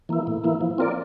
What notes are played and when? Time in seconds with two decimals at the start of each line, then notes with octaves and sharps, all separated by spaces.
0.09 E3 A#3 E4
0.27 A2
0.44 E3 A#3 E4
0.61 F3
0.78 C4 F4 A#4 D5